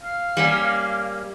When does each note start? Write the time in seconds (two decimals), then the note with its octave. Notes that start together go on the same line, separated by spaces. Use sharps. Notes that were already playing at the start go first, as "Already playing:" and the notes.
0.03 F5
0.37 G3 A#3 C#4